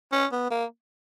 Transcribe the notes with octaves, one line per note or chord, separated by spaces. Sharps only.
C#4
B3
A#3